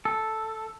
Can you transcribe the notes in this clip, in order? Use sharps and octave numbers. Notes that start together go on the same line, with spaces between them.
A4